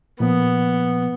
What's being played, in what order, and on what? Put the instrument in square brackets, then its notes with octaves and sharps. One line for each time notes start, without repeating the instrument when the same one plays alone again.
[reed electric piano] A#2 F3 [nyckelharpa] B3